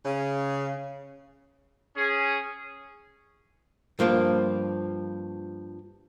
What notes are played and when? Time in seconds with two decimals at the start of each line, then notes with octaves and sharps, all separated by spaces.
0.06 C#3
1.96 C#4 G#4
3.99 G2 F3 A#3 F4